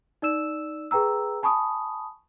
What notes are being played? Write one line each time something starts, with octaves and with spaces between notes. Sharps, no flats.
D#4 D5 E6 E7
G#4 B4 G5 A#5 E6
G#5 A5 B5 C#6 D#6